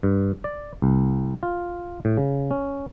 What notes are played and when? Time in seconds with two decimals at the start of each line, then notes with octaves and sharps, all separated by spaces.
0.03 G2
0.44 D5
0.82 C2
1.43 F4
2.05 A2
2.17 C#3
2.51 C#4